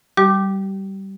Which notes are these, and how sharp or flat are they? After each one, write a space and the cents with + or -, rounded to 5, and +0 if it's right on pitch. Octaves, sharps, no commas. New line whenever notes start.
G3 -15 G4 -35 D6 +10